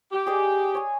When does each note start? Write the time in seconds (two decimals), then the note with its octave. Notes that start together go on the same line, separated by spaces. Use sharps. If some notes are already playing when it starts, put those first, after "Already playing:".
0.11 G4
0.27 G#4 D5 D#5
0.75 C#5 G#5